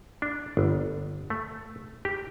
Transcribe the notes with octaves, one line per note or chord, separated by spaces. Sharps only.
D4
G1
A3
G4